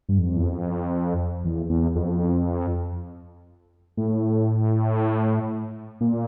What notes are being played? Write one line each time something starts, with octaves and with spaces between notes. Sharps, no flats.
G2
F2
E2
F2
E2
E2
F2
A2
A#2